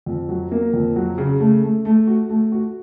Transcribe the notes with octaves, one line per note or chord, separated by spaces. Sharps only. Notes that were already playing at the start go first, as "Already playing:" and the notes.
F2
F#3
A#3
F2
F#3
C#3
A3
A3
A3
F#4
A3
F#4